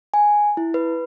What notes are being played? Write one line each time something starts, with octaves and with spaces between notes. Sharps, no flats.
G#5
E4
B4